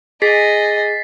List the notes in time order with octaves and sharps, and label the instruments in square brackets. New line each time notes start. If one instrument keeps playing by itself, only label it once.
[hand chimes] G#4 [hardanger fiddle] D#5 G#5 [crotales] A6 B6 C7